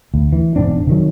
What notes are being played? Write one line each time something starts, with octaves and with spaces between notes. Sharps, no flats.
D2
E3
E1 G#2 C4 D4
C3 D#3 F#3